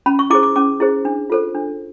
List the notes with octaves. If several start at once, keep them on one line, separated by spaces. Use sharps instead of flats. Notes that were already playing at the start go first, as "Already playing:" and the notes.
C#4 B5
C#6
E4 G#4 C5 D6
D6
C#4 D6
E4 G#4 C5
D4
F4 A4 C5
D4